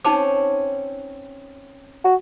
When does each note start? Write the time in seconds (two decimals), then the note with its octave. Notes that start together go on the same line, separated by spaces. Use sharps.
0.05 C4 C#4 D#4 C#5 A5 D6
2.04 F#4